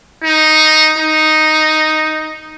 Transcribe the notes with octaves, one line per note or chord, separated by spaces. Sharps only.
D#4
D#4